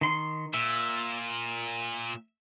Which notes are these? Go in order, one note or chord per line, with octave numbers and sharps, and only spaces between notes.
D#3 C6
A#2 E5